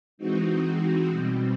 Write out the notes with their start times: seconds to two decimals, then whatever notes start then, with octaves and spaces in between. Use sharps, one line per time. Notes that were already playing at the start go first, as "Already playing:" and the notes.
0.18 E3 G#3 C4 D#4 F#4
1.09 B2 G3 C4